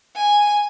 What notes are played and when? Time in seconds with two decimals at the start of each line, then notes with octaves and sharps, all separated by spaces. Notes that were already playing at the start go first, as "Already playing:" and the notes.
0.16 G#5